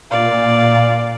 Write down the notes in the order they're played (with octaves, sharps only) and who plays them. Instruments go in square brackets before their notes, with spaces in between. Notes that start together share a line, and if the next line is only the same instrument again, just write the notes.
[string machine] A#2 [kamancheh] D5 F5